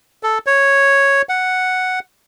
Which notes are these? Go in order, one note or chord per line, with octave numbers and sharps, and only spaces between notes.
A4
C#5
F#5